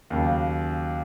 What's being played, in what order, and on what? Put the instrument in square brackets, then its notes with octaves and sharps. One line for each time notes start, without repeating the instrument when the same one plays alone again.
[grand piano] D#2 C#3 F#3